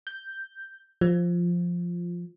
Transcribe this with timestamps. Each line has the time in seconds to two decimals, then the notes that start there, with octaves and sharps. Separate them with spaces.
0.07 G6
1.01 F3